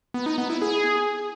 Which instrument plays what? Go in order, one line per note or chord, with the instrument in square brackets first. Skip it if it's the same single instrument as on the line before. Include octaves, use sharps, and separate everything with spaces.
[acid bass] B3
D#4
B3
E4
G#4